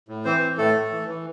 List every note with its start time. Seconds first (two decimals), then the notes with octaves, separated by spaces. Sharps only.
0.08 A2
0.25 E3 C4 C5
0.41 E3
0.57 A2 A3 A4
0.74 A2
0.91 E3
1.08 E3